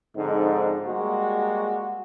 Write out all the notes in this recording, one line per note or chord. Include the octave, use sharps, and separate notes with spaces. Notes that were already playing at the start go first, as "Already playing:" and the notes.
G#2 D3 F3 C4 D#4
G3 G#3 A#3 F#4